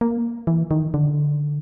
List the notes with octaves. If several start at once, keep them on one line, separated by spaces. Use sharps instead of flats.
A#3
E3
D#3
D3